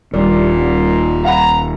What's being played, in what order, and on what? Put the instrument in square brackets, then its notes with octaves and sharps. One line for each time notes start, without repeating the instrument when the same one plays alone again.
[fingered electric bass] D#1 [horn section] A#2 [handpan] G3 D5
[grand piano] F5 F#5 B5 [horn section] A#5